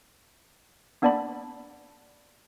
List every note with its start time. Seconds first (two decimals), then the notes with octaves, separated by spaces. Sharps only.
1.02 A#3 B3 D4 D5 A5 B5